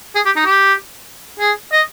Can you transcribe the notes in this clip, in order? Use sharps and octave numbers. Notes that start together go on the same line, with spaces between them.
G#4
G4
D#4
G4
G#4
D#5